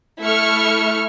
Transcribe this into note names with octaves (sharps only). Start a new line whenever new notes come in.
A3 E4 C#6 F6